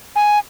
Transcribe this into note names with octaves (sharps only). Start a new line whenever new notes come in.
G#5